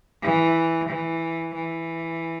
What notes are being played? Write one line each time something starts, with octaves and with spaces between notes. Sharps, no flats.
E3
E3
E3